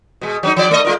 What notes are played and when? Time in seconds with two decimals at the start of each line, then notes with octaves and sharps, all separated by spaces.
0.21 B2 G#3
0.43 F#3 B3 D#4
0.56 F3 D5
0.71 A3 D#5
0.85 G#3 F4 A#4